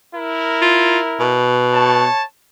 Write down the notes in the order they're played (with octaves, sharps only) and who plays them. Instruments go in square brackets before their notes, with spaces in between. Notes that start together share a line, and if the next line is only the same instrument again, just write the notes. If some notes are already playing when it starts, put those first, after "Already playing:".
[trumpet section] E4 A#4
[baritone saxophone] F4
B2
[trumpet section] C#5 A5